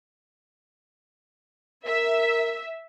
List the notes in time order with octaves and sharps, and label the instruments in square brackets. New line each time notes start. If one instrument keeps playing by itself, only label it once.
[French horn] A#4 [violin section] E5